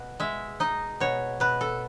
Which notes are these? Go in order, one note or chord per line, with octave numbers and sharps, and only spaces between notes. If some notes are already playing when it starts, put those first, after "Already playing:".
Already playing: B2
G#3 E5
D#4 D#5
B2 C#5
B2 B4
A4